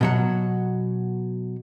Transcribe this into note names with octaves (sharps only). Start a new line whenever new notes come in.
B2 F#3 F#5